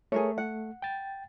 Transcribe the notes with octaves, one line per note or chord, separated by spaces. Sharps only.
A3 G#4 A#4 C#5
F#5
G5 A6